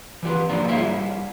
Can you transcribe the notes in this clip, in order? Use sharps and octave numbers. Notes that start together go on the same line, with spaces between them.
E3 F#3 G4 B4
G#2 D3 F3 A#3 D5 A#5
E4 G4 G#4 C#5 E5 F5
G3 E4